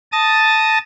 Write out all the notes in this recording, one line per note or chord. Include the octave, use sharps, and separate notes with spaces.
A5 D#6 A6 A#6